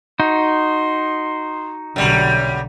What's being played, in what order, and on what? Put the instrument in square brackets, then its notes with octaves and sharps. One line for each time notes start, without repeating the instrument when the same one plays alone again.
[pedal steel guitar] D#4 F#4 [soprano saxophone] C6
[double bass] B1 D3 [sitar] F#2 G3